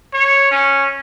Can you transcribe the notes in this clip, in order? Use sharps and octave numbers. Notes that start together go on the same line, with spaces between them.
C#5
C#4